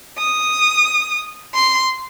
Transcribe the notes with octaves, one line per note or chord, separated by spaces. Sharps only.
D#6
C6